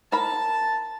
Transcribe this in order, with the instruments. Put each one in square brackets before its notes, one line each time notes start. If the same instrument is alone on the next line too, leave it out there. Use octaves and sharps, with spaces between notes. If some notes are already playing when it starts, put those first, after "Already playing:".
[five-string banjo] A#4 B5 [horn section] A5